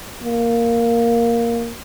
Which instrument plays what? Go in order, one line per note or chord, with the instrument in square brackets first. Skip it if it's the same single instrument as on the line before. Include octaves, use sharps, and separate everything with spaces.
[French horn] A#3